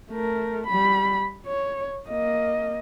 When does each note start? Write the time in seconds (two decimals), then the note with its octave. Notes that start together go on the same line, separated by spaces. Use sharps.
0.11 A3 A#4
0.67 G3 B5
1.46 C#5
2.08 A#3 D#5